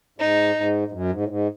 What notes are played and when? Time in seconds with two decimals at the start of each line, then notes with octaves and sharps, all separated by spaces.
0.19 G#2 D#4
0.55 G#2
0.88 G#2
0.92 F#2
1.11 G#2
1.21 A2
1.28 G#2